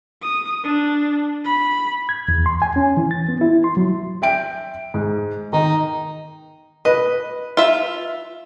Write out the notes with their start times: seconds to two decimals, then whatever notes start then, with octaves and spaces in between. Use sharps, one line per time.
0.22 D#6
0.64 D4
1.44 B5
2.09 G#6
2.28 E2
2.46 C6
2.62 G#5
2.76 C#4
2.97 E3
3.11 A6
3.29 B3
3.41 E4
3.64 C6
3.77 F#3
4.22 E5 G5 D7
4.94 G#2
5.53 D#3 D#4
6.85 B4 D#5
7.57 F4 E5